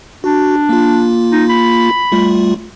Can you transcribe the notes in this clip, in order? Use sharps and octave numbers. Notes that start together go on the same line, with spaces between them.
D4 F#4
A#3 F4
D#4
B5
G3 A3 F4